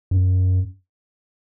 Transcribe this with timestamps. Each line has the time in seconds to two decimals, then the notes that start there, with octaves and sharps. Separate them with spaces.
0.11 F#2